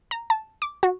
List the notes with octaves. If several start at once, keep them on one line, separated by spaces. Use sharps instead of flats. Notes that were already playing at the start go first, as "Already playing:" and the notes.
A#5
A5
D6
F#4